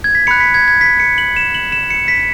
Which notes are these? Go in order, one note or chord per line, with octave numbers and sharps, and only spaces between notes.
G#6
B6
B5 F#6 C#7
B6
G#6
G#6
B6
C#7
F#7
E7
F#7
E7
C#7
B6